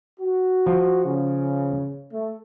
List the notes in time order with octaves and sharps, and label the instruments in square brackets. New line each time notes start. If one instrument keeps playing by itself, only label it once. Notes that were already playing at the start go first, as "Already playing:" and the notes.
[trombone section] F#4
[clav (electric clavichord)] F3
[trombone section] C#3
A3